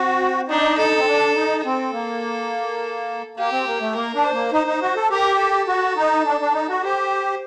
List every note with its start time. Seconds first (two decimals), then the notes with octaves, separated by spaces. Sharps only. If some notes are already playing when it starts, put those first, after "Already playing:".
Already playing: C4 F#4
0.48 D4 D#4
0.77 A4
0.98 C4
1.07 D4
1.35 D#4
1.64 C4 A4
1.93 A#3
3.37 A#3 G4
3.52 C4
3.66 A#3
3.81 A3
3.95 A#3 A#4
4.14 D4
4.24 C5
4.33 A#3
4.52 D#4 C5
4.67 D#4
4.82 F#4
4.96 A4
5.10 G4 A#4
5.39 A4
5.68 F#4
5.97 D#4
6.26 D4
6.41 D4
6.54 D#4
6.69 F#4
6.83 G4 C5